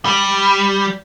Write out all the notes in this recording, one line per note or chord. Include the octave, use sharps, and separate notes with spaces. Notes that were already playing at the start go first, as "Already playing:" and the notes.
G3